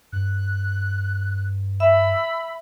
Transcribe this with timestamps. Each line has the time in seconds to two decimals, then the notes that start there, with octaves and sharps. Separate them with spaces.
0.13 G2 F#6
1.80 E5 B5 E6